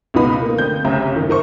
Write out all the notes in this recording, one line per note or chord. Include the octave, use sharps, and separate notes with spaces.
C#2 B2 B3 D#4 B5 D#6
A#3
D3 C4 G6
G1 C2 C#3 E5 A#5
F#1 D#3
D#4 A#4 C5 C#6